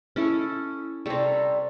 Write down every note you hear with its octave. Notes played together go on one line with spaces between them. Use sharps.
C#4 E4 A4
C3 G3 A4 C#5